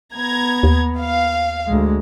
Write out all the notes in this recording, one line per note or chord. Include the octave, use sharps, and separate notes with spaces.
B3 A#5 G#6
D#2
F5
D2 G#3